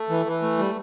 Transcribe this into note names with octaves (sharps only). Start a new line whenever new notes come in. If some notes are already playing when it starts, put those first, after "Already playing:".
Already playing: A3
E3
E3
A3
G3